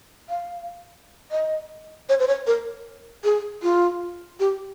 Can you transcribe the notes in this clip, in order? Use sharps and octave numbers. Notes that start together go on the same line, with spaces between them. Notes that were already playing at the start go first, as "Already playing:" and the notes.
F5
D#5
C#5
C5
C#5
A#4
G#4
F4
G4